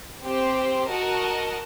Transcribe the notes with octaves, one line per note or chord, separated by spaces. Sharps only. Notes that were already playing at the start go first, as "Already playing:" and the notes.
C4 G4 C5 G5
F#4 A#4 D#5 A5